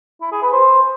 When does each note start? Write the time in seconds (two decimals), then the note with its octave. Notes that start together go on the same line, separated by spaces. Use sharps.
0.21 E4
0.32 G#4
0.42 B4
0.53 C5